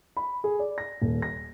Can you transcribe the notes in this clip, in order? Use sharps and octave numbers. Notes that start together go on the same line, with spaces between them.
B5
G#4
D5
A#6
D#1
A#6